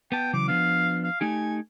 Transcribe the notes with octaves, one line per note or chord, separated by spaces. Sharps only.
B3 G5 A5
C#3 E3 F#3 D6
F3 B3 D4 F5
F5
A3 D#4 G4 G#5